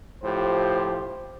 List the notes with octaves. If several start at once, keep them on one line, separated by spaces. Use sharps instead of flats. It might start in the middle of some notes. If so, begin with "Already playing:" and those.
A2 F3 G4 C5